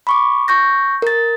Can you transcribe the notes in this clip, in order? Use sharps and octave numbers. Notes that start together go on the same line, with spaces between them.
B5 C#6 D6
C#6 G6 A#6
A#4 A6